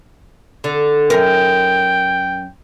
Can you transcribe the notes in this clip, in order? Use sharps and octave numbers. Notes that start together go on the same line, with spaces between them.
D3
F#2 A#4 G5